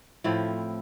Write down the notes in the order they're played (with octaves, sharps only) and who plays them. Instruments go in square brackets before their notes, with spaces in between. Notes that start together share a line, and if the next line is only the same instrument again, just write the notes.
[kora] A2 F3 A3 C4 E4